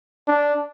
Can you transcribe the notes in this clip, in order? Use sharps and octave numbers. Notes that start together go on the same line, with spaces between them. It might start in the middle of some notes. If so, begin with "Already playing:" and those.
D4